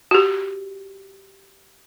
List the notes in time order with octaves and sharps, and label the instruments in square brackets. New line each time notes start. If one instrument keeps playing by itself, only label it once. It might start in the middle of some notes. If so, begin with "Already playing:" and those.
[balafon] F#4 G4